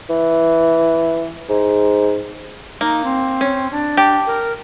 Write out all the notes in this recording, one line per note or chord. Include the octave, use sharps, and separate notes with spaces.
E3
G#2
A#3 D#4
C4
C#4
D4
G4
A#4